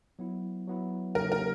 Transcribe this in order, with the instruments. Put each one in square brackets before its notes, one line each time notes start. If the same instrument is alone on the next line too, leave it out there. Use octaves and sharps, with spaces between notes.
[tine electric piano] F#3 B3 E4
F#3 B3 E4
[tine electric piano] C#3 F#3 A#3 D#4 G4 [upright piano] A#4
[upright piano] A#4